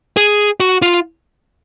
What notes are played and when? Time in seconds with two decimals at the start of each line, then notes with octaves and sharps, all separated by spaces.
0.17 G#4
0.60 F#4
0.82 F4